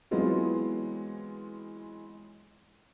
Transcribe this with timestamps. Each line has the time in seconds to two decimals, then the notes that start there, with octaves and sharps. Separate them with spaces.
0.11 E3 F#3 G#3 B3 C4 F4